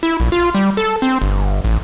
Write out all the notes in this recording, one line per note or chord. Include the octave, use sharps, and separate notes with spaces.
E4
A#1
F4
G3
A4
C4
G1
A1